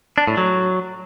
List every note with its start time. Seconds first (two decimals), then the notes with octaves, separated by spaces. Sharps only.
0.18 D4
0.28 A2
0.37 F#3